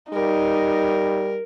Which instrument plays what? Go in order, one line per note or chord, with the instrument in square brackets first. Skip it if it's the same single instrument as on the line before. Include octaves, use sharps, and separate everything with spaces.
[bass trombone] G3 [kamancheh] D#4 [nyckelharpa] A#4